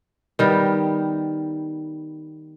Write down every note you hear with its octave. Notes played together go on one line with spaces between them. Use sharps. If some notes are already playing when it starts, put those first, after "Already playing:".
D#3 G3 B3